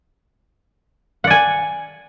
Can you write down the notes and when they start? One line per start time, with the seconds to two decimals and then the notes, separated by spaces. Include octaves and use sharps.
1.24 F#5
1.27 D5
1.30 G#5